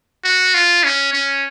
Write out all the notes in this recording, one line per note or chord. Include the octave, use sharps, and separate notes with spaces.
F#4
F4
C#4
C#4